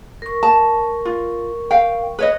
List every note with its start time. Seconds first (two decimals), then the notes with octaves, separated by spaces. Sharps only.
0.22 A#4 C#6
0.43 A5
1.05 F4
1.71 F5 G5
2.19 B4 C#5 D#5